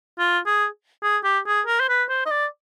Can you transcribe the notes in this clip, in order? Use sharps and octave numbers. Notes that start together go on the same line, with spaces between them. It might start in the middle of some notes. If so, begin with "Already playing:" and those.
F4
G#4
G#4
G4
G#4
A#4
C5
B4
C5
D#5
D5